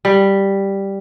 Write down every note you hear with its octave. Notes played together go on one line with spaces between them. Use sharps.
G3